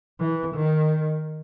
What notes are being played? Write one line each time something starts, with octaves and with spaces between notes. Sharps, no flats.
E3
D#3